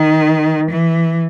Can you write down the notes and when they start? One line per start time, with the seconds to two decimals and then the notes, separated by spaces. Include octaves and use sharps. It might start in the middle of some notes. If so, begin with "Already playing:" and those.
Already playing: D#3
0.71 E3